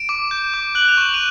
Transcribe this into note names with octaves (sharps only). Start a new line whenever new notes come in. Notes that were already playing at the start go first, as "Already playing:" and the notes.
Already playing: D7 E7
D6
G6
D6
F#6 F#7
F7
C#6 E7
D#7 F7